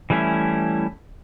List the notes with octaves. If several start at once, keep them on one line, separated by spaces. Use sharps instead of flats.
E3 G3 A3 C#4 E4